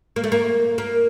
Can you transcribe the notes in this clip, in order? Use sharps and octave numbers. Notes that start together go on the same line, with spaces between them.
A#3
A3
A#3
A#3